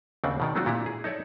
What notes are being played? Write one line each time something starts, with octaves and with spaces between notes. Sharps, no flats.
D#2 C#3 C4 D4 D5 F#5
B2 D#3 D5
F#3 A3 C4 D4 F4 F#4
A#2 D4 E4 G4 A#5
G#4
D#4 A4 C#5 D5 E5